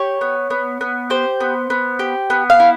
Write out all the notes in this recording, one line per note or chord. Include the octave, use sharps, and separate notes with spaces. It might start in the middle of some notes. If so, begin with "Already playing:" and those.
Already playing: G4 C#5
B3
B3
B3
G4 C5
B3
B3
G4
B3
F5
E4